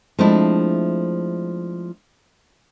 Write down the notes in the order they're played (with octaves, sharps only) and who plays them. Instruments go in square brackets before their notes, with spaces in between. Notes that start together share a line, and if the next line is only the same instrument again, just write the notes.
[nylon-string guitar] F3 G#3 A3 C4 D4 E4